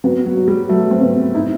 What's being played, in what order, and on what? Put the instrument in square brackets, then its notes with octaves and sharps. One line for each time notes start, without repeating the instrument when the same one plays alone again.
[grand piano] F#3 [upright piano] B3
[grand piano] F#3
[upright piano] F#3
[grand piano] G3
[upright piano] F#3 [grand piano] A3
[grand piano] C4
[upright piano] B3
[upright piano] D#4 [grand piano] E4